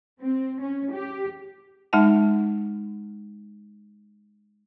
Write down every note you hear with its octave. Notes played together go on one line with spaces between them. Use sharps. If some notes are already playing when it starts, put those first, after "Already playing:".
C4
C#4
G4
G#3 D#4 F#5 A5